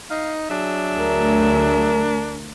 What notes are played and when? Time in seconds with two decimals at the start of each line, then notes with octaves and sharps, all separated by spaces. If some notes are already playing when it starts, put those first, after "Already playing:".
0.10 D#4 F5
0.51 F#3 D4 G#4 E5
0.96 D2 A#4